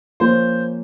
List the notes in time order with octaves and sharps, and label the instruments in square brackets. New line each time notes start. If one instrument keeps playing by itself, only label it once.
[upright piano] F3 A#3 C#4 C5